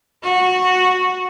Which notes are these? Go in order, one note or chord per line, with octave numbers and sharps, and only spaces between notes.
F#4